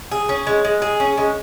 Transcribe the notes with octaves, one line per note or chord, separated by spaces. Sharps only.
G#4
C#4
G#3
G#3
G#4
C#4
G#3